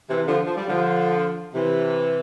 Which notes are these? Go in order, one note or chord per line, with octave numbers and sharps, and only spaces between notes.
C3 E3
D3 F3
F3
G3
D3 F3
C3 E3